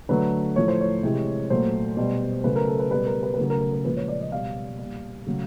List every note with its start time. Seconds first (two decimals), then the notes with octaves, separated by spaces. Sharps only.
0.09 D3 F#3 A3 B4
0.56 A2 F3 A3 C#5
0.68 C5
0.81 C#5
1.03 C3 E3 G#3
1.50 A#2 F#3 A3 C5
1.97 B2 G3
2.44 C#3 F#3 A3 B4
2.56 A#4
2.68 A4
2.79 B4
2.91 B2 G3 B4
3.06 A#4
3.23 B4
3.34 B4
3.38 C#3 F#3 A3 A#4
3.50 A#4
3.61 A#4
3.73 A#4
3.85 A#2 F3 G#3 B4
3.97 C#5
4.08 D5
4.21 D#5
4.32 B2 G3 F5
4.79 A#2 G3
5.26 C#3 F#3 A3